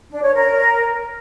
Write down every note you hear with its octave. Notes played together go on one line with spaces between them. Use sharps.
D4
C#5
A#4